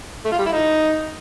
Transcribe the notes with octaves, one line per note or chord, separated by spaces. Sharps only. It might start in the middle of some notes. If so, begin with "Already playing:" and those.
A3
F4
G3
E4
D#4